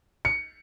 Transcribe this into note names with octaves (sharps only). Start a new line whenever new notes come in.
C#7